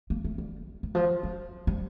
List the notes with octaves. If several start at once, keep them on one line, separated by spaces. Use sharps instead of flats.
A#3
A3
G3
D#3
F3
G3
G3